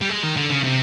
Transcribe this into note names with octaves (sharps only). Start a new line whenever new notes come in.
G3
G#3
D#3
D3
C#3
C3